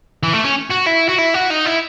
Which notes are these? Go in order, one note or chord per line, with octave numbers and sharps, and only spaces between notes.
E3
A3
C#4
F#4
E4
F#4
E4
F#4
D#4
E4